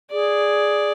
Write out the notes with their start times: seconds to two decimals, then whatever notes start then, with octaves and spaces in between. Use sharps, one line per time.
0.12 G#4 D5